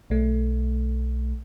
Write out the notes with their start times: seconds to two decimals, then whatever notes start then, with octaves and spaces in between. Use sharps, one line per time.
0.10 B1 A3